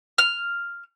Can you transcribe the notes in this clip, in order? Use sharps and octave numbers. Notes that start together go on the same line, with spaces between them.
F6